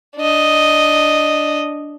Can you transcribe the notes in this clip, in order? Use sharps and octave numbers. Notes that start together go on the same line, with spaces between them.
D4 D#5